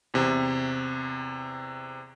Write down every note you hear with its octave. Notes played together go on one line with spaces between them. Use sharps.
E2 C3